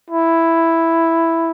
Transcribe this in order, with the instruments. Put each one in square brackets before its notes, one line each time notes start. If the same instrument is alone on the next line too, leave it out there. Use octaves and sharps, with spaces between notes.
[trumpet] E4